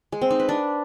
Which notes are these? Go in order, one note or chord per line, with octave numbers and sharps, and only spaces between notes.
G#3
C4
D#4
B4
D4